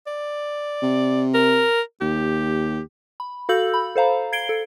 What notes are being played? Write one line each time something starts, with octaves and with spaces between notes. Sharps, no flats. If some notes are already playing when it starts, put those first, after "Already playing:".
D5
C3
A#4
D#2 G4
B5
F#4 A4 F5 E6 G6 F#7
B5
A4 C5 F5 A#5
G#6 C7 D7 G7
A4